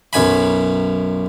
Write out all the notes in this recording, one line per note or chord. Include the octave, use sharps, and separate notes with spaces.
B1 F#2 G#5 B5